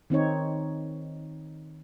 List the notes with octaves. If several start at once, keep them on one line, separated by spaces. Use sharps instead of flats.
D#3 C4 D#4 C#5